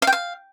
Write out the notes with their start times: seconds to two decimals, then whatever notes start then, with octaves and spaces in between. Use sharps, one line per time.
0.02 F5
0.07 G5
0.13 F5